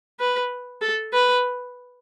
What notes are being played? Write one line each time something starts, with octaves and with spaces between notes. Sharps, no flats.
B4
A4
B4